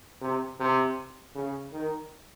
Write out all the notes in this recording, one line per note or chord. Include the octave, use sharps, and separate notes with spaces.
C3
C3
C#3
D#3